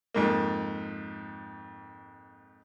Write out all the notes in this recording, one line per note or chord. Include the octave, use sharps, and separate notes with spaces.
F2 G#2 A#3